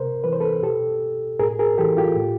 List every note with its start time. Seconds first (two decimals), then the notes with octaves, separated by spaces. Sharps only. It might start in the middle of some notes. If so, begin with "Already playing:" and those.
Already playing: C3 A#4 C5
0.24 E3 B4
0.33 C5
0.40 A4 B4
0.63 B2 G4 A4
1.39 A2 G#4 A#4
1.59 G#4 A#4
1.78 E3 G4 A4
1.97 F4 G4
2.16 A2